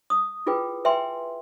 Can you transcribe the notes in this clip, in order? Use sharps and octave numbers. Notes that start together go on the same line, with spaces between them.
D#6
E4 F4 G#4 B4 G5
B4 E5 G5 G#5 C6